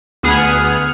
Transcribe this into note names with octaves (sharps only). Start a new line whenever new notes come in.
D2 B3 G#4 F#5 F6